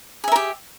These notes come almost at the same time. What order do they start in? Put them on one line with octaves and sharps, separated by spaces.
G#4 E5 A#4 G4